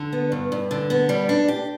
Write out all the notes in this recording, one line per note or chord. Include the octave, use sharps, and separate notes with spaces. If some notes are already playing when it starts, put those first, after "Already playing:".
Already playing: D3
B3
G2
G2
D3
B3
G3
D4
G4